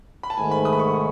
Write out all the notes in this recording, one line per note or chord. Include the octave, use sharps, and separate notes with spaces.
B5
A5
G#2 D#3 A3 G#5
B5
D#6
B5
C#6
C#6